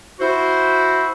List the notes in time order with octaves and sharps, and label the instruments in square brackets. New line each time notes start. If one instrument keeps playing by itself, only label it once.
[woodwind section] E4 F#4 C5